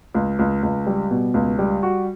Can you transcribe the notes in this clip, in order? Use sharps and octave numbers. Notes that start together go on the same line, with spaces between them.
C#2
C#2
C#2
G3
B2
C#2
G3
F#4